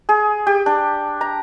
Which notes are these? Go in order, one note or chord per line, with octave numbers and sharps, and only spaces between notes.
G#4
G4
D4
A#5